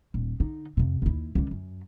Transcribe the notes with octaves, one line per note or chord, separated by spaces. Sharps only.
D#1
D3 D#4
F2 C3
D#2 E4
C#2 D3
F#2